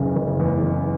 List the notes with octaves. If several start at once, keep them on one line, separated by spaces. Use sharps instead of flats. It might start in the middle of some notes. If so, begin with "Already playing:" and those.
Already playing: F#1 E2 C#3
F#1
E2
F#1